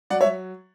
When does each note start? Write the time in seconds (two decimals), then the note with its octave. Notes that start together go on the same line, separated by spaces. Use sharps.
0.10 F#3 D5 F#5
0.21 C#5 E5
0.25 F#3